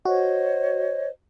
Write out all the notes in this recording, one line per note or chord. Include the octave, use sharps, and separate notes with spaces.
F#4 C5 C#5 D#5